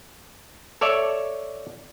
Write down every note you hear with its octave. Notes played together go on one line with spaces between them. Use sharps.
A4 C#5 D5 E5